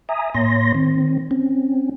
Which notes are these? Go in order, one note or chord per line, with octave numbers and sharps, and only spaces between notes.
E5 G#5 A#5 D#6
A2 A#3 C#5 C6 A#6
D#3 C4
C4 C#4